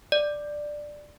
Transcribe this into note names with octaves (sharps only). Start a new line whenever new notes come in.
D5